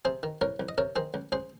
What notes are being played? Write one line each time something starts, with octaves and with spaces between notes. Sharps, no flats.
C3 G#4 C5
D#3
C2 A#4 C#5
C2
D#5
C3 A#4 C#5
D#3 G#4 C5
C#2
C#2 G#4 C5